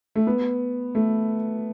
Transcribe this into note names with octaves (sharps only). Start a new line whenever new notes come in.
A3
B3
A3